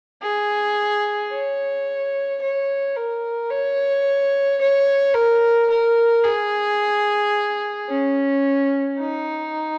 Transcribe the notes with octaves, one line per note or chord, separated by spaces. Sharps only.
G#4
C#5
C#5
A#4
C#5
C#5
A#4
A#4
G#4
C#4
D#4